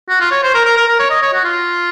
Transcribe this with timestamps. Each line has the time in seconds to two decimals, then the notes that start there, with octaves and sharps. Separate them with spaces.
0.09 F#4
0.20 F4
0.31 C#5
0.43 C5
0.54 A#4
0.65 A#4
0.77 A#4
0.88 A#4
0.99 C#5
1.10 D#5
1.22 C#5
1.33 F#4
1.44 F4